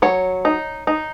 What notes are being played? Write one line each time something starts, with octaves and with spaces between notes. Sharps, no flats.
F#3 C#5
D#4
D#4